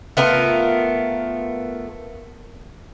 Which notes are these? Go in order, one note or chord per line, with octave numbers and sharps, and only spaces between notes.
A3 B3 F4 A#4